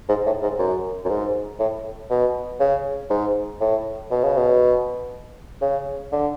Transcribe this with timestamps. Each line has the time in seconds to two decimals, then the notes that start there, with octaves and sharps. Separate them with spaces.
0.09 G#2
0.26 A2
0.43 G#2
0.59 F#2
1.05 F#2
1.10 G#2
1.60 A2
2.10 B2
2.60 C#3
3.10 G#2
3.61 A2
4.11 B2
4.24 C#3
4.38 B2
5.62 C#3
6.12 D3